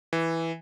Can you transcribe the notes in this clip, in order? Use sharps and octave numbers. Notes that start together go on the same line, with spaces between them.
E3